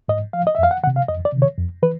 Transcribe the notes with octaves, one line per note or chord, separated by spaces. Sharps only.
G#2 D#5
F3 F5
D#5
E5
F2 F5
F#5
C3 D#3 F#5
F5
F2 D#5
D5
C3 D#3
C#5
F2
E3 B4